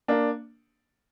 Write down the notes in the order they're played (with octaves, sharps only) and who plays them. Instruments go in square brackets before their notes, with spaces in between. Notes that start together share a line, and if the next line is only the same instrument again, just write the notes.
[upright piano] A#3 D4